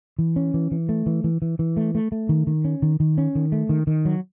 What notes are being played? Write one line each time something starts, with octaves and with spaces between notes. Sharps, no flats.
E3
C#4
E3
E3
A3
E3
E3
E3
E3
A3
A3
A3
D#3
D#3
C#4
D#3
D#3
C#4
D#3
A3
D#3
D#3
F#3